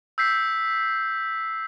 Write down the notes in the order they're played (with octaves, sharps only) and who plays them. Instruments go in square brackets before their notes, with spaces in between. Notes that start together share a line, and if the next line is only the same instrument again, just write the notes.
[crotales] E6 G6 B6 C7